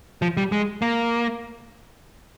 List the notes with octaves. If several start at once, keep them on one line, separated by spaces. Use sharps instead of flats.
F3
G3
G#3
A#3